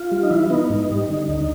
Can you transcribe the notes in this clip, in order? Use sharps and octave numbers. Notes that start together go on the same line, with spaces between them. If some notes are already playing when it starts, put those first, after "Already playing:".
Already playing: F4
G3
D#4
E3 E4
B3 D#4
G#2
G3
D3
D2